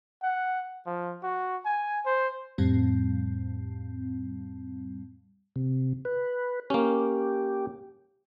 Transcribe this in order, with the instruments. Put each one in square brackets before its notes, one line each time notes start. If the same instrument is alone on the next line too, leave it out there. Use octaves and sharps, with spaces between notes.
[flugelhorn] F#5
F3
F#4
G#5
C5
[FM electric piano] F2 A2 G3 C4
[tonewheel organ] C3
B4
[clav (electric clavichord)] A#3 C#4 [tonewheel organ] G4